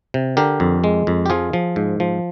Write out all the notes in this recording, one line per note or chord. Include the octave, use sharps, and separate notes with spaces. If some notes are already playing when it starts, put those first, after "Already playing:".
C3
D3 G4 A#4
F2
G#3
F2
G4
F3 F4 G#4
F3
G#2
F3